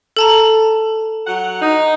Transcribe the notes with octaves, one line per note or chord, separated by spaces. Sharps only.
A4 A5 A#5
F#3 F#5
D#4